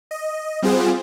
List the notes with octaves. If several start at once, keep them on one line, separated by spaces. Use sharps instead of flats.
D#5
G3 C4 F4 G#4 C5 F#5